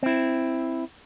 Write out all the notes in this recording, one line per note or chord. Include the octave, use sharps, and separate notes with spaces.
C4 E4